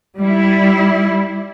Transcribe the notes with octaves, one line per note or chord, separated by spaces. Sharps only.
G3 E4